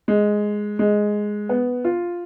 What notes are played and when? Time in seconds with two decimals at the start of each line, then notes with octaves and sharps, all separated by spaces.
0.08 G#3
0.79 G#3
1.49 B3
1.84 F4